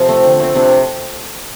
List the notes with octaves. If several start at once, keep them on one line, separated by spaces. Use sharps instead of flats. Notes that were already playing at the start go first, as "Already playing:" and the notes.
Already playing: C3 F3 F4 A4
A3 C4
D3
A3 C4
C3 D4